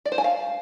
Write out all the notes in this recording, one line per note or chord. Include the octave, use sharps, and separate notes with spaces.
D5
C5
G#5
F5